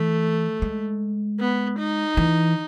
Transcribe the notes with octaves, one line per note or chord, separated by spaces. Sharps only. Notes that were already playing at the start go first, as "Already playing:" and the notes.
Already playing: E3 A3
G#3
B3
D#4
E3